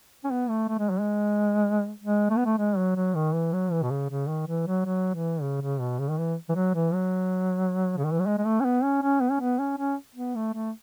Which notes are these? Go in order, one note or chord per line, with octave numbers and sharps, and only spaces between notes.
C#4
B3
A3
A3
G#3
F#3
G#3
G#3
A3
B3
A3
G#3
F#3
F#3
D#3
E3
F#3
E3
B2
C#3
C#3
D#3
E3
F#3
F#3
E3
C#3
C#3
B2
C#3
D#3
E3
E3
F#3
E3
F#3
C#3
D#3
E3
F#3
G#3
G#3
A3
C#4
B3
C#4
C#4
B3
C#4
B3
C#4
C#4
B3
A3
A3